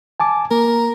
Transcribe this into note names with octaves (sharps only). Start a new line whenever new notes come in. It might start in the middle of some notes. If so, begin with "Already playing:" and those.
G#5 A5 D6
A#3 A#4